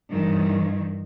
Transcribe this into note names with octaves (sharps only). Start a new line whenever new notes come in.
G2 D#3 E3